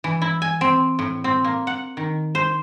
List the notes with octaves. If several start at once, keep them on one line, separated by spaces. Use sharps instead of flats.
E3
E4
G#5
C4
A2
C4
A#3
F#5
D#3
C5